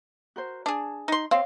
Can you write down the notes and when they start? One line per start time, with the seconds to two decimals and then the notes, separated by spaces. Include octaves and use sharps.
0.36 F#4 A#4 C5
0.66 D4 G#4 A5
1.08 D#4 C6
1.31 C4 C#5 D#5 F5